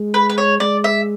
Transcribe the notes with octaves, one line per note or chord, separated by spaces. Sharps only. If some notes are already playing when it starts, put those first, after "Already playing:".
Already playing: G#3
B4
B4
C#5
G#3 D5
E5